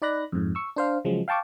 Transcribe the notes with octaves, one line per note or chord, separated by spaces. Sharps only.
D#4 D5 B5 F#6 A#6
F2 G#2
C#6 E6
D4 C5 F5
C#3 F3 F#3 G#3
F5 G5 A5 C#6 D6